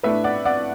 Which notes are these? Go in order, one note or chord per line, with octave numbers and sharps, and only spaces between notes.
A2 A3 D4 B4 E5
D5 F#5
D5 F#5